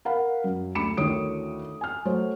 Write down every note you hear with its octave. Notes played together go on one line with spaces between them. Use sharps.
A#4 F5 F#5 B5
F#2
D2 B5 D6 C#7 E7
D2 D#3 E4 C#5 D#6 D7
G#5 F6
F#3 A3 C5 C#5